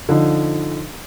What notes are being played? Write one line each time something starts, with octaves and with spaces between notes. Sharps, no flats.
D3 F3 D#4